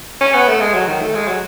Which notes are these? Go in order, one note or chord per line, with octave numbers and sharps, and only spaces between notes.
C#4
B3
A3
G#3
F#3
D#3
A3
G#3
F#3